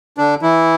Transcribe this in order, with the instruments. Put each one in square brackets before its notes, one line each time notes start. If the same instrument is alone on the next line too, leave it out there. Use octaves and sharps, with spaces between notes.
[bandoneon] D3 D4
E3 E4